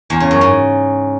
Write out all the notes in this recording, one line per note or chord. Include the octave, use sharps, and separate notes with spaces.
E2
C#3
F#2
G#2